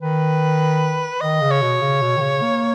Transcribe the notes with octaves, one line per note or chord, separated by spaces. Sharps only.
D#3 B4
D#3 D#5
C#3
C#5
B2
C#3
B2
D#3
C#3
A#3